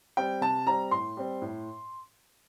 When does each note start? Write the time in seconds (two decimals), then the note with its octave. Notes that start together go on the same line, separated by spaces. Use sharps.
0.17 G3 C4 G5
0.41 C3 A5
0.66 G3 C4 A#5
0.91 A2 C6
1.17 G3 C4
1.42 A2